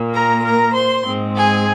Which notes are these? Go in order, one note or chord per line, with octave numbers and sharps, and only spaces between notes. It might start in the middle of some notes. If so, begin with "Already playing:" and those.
Already playing: A#2 A#3
A#4 A#5
A#4 A#5
C5 C6
G#2 G#3 C4
G#4 G#5